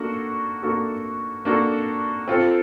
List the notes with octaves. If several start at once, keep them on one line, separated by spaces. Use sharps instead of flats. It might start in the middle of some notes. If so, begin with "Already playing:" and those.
Already playing: A#3 D4 F#4 A4
A#3 D4 F#4 A4
A#3 D4 F#4 A4
C4 F4 A4